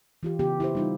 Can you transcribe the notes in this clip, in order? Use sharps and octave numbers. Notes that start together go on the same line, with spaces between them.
E3 F4 G4
C#3 B3 G4
E4 G4 C5
G3 D#4 F4